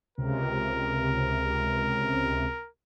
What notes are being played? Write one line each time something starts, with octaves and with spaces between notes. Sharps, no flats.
C#2 C3 A#4